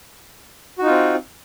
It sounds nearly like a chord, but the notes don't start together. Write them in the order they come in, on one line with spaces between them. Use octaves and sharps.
F#4 D#4 F4 C4